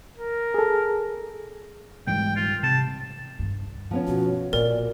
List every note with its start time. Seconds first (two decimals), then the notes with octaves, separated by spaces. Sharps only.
0.18 A#4
0.54 G#4 A4
2.07 G#2 E3 G3 G5
2.36 F4
2.63 C3 A5
3.39 D2 G2
3.91 F3 B3 C#4
4.07 B2 F#4
4.53 A#2 B3 C4 A#4 D5